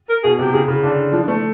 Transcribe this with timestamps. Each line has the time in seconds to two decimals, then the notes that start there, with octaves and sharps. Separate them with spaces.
0.09 A#4
0.23 B2 G#4
0.39 C3
0.42 G4
0.53 C#3 G#4
0.68 C#3
0.83 D3 D4
1.12 F3 D4
1.23 D4
1.28 A3